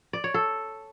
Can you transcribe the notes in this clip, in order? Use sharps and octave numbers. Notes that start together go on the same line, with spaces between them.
D5
C#5
A4